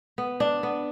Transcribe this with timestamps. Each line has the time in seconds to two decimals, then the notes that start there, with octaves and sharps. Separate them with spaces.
0.18 B3
0.40 D4
0.63 B3